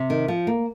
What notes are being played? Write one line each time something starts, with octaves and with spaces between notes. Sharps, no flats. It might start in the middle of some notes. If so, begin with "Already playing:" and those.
Already playing: C3
D#3
F3
A#3